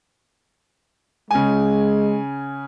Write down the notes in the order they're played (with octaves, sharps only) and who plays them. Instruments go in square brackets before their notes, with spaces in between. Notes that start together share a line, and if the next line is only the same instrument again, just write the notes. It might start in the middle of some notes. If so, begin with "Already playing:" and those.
[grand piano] C#3 G#5 [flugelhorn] G#3